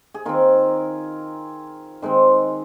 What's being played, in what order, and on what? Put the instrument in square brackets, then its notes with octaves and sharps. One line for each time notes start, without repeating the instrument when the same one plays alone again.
[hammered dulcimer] G#4
D#3 C4 F4 A#4
D#3 G#3 C4